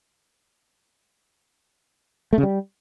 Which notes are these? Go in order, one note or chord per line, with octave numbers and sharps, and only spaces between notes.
A3
C#3
G3